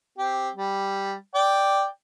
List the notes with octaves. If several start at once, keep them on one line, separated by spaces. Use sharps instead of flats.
C4 G4
G3
D5 G5